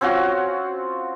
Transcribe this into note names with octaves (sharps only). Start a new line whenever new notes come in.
C4 C#4 F4 F#4